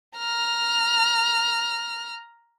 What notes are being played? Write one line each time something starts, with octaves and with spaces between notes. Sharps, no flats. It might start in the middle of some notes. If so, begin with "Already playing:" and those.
A#5 F6